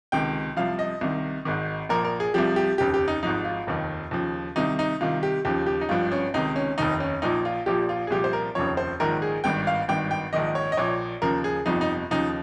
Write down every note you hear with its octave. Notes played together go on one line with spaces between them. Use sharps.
C#2 C3 D#3 G5
C2 C3 F3 F5
D#5
C2 C3 D#3
G#1 G#2 D#3
A#1 A#2 F3 A#4
A#4
G#4
C2 C3 F3 G4
G4
F1 D#2 C#3 G4
G4
D#4
G#1 G#2 F3 D#4
F4
F1 D#2 D#3
D#2 C#3 F3
C2 C3 D#3 D#4
D#4
C2 C3 D#3 F4
G4
D#2 C#3 F3 G4
G4
D#4
G#1 G2 F3 F4
C#4
C#2 C3 D#3 D#4
C#4
F1 D#2 D#3 D#4
C#4
A#1 A#2 F3 D#4
F4
A#1 A#2 F3 G4
F4
G#4
C2 A#2 F3 G4
C5
A#4
F1 D#2 C#3 F3 C#5
C5
A#1 G#2 D#3 A#4
G#4
G#1 G2 D#3 G5
F5
G#1 G2 D#3 G5
G5
A#1 G#2 D#3 D#5
C#5
D#5
A#1 A#2 F3 C#5
D#2 C#3 F3 A#4
G#4
G1 F2 C3 F3 D#4
D#4
D#2 C#3 F3 D#4